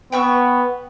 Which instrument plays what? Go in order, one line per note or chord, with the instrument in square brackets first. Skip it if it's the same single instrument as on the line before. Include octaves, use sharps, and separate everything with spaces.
[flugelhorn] B3 [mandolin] G5 C#6 E6